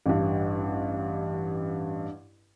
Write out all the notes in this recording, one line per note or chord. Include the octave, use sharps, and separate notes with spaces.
A1 G2